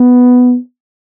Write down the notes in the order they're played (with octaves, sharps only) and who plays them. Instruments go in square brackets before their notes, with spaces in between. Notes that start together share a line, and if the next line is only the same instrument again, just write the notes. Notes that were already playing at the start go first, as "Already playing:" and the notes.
Already playing: [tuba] B3